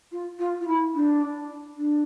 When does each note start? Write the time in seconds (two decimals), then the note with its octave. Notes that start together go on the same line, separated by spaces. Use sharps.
0.12 F4
0.39 F4
0.60 F4
0.67 E4
0.95 D4
1.77 D4